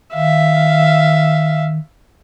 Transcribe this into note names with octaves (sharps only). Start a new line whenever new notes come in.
D#3 E5 F5